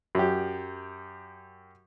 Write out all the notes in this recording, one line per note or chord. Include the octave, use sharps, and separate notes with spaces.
F#2 G4